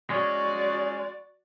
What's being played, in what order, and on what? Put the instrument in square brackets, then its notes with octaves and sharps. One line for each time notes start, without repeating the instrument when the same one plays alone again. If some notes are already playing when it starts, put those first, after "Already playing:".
[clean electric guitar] G#3 C#4 [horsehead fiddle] F#4 D5